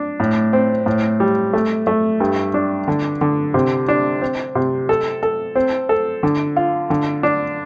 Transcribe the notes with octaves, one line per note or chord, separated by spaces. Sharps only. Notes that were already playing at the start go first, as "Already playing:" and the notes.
Already playing: D4
A2
C4
A2
G3
A3
A3
G2
D4
D3
D3
C3
D4
C4
C3
A4
A4
C4
A4
D3
F4
D3
D4